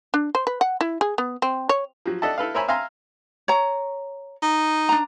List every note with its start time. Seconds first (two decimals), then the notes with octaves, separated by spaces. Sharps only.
0.14 D4
0.35 C5
0.47 B4
0.61 F#5
0.81 E4
1.01 G#4
1.18 B3
1.42 C4
1.69 C#5
2.06 F3 F#3
2.22 D4 A4 D#5 E5 F#5 A5
2.38 E4 A4 B4 F5
2.55 A#4 C5 C#5 E5 G#5 B5
2.68 E5 F5 G#5 A#5 C6
3.48 C#5 A#5
4.43 D#4
4.89 D4 A#5